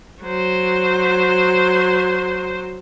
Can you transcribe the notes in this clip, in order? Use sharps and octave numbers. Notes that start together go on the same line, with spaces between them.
F#3 C5